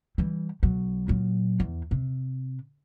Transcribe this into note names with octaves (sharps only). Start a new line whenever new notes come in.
E3 G3
B1 F#3
A#2 F#3
E2
C3